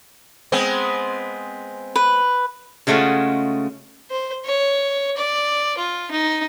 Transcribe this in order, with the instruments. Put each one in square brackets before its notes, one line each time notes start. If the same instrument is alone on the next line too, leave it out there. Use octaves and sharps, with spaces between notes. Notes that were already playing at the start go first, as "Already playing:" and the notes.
[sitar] G#3 B3 C4
[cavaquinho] B4
[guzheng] C#3 G#3 A3 F4 F#4
[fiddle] C5
C#5
D5
F4
D#4